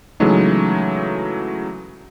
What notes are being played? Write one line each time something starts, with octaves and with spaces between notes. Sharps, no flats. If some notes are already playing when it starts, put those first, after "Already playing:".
C#3 E3 F#3 G#3 A3 D#4